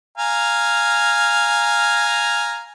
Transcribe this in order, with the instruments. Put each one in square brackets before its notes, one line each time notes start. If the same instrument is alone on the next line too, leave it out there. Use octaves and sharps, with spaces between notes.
[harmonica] F5 G#5 A#5